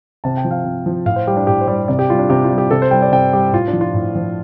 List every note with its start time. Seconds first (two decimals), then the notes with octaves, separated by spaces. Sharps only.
0.24 C3 A5
0.37 G5
0.45 F3
0.51 F5
0.65 C3
0.86 F3
1.06 A2 F5
1.16 C5
1.27 G3 G4
1.37 D4
1.47 A2 G4
1.61 C5
1.68 G3 D5
1.88 C3 D5
1.99 G4
2.10 G3 F4
2.19 D4
2.30 C3 G4
2.44 F4
2.50 G3
2.58 G4
2.71 C3 A4
2.82 C5
2.91 G3 G5
3.02 D5
3.12 C3 G5
3.33 G3 G4
3.53 A2 F4
3.68 D4
3.73 F3
3.81 F4
3.94 A2
4.15 F3